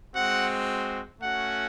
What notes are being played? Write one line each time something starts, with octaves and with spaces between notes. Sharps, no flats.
G#3 C4 F#4 F#5
A3 C#4 F#4 F#5